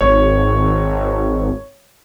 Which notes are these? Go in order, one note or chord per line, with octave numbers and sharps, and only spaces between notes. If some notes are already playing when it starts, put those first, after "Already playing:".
G#1 C#5